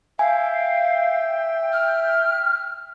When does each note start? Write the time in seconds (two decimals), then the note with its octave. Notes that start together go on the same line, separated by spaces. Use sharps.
0.19 E5 F5 G5 G#5
1.73 F6